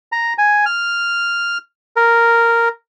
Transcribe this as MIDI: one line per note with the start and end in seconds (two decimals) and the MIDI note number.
0.12 0.33 82
0.38 0.65 80
0.66 1.58 89
1.96 2.69 70